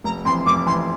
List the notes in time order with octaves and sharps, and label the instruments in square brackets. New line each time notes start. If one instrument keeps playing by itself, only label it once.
[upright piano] F1 [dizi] A#5
[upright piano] F2 [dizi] C6
[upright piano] E3
[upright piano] F1 [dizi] D6
[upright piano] F2 E3 [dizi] C6